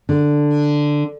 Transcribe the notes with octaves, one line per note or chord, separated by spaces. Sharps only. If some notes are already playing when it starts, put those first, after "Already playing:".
D3